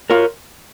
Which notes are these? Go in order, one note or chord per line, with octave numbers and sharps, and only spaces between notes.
F4 A#4 C#5